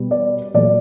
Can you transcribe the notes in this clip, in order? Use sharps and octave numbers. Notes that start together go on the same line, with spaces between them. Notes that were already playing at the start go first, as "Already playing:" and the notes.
Already playing: B2 G3 B3
D5
A#2 F#3 A3 D5